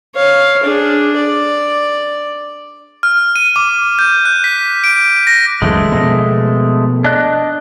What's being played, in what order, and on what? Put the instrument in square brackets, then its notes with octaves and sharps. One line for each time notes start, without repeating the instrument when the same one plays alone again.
[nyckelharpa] C#5 F5
D4 G#4
D5
[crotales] F6
D#7
D6
G6
F#6
B6
D7
A#6
[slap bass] C#2 F#2 E3 [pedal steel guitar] G#3 A3
[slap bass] B2 F3 A#3
[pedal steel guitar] D4 D#5 F#6